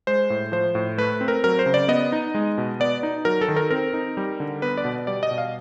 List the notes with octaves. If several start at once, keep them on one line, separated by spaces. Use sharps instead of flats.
G#3 C5
A2
F3 C5
A2
A3 B4
C4
A#4
F#3 A#4
C5
C#3
D5
B3 D#5
D#4
G#3
B2
B3 D5
D#4
F#3 A#4
A4
D#3
A#4
C4 A#4
D#4
G3
D3
B3 B4
D5
B2
G3 D5
D#5
B2
F5